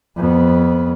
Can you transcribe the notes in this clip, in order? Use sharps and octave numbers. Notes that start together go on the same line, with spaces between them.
F2 B3